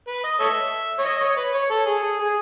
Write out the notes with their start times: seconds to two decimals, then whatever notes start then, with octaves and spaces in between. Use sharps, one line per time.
0.08 B4
0.24 D#5
0.40 A4 C#5 E5
0.99 C#5
1.05 D#5
1.17 D#5
1.21 C#5
1.37 B4
1.54 C#5
1.70 A4
1.86 G#4
2.03 G#4
2.19 G#4